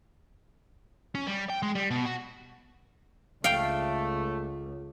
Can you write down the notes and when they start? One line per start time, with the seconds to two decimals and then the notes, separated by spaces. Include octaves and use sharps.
1.15 C#4
1.27 G3
1.50 G5
1.63 G#3
1.75 G3
1.91 B2
2.06 F#4
3.44 C#2 A3 F5 G5